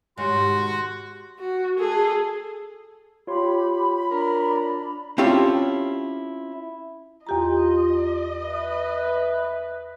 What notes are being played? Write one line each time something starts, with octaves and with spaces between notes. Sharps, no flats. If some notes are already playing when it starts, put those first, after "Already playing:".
G#2 B2 D#3 F#4 G4 C#5 C6
F#4
G#4 A4
F4 G4 C#5 B5 C6
D4 A#4
C4 C#4 E4 F4 G4 A4
E2 F4 G4 D#5 A#5
B4 E5